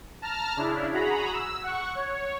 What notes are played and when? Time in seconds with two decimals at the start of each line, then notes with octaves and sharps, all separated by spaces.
0.22 A5 A#5 F6
0.56 C#3 D4 E4
0.93 F#4 G#4 A#5 B5
1.33 E6
1.63 F#5 C#6
1.95 C#5